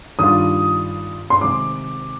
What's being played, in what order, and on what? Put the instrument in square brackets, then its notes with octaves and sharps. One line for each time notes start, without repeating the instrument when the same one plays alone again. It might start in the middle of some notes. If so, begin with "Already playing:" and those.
[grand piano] G2 D#3 G3 D4 F4 [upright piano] D#6
[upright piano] C6
[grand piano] C3 D#3 G#3 D#4 [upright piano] D6